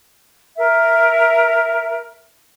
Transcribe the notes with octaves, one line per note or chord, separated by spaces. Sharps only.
A#4 E5